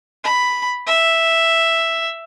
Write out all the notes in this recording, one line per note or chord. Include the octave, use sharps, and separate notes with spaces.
B5
E5